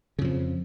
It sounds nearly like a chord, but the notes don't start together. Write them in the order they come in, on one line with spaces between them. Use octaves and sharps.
C#3 F2 F3